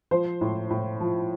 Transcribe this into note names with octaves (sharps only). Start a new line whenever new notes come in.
F3 C5
A2
A2
F3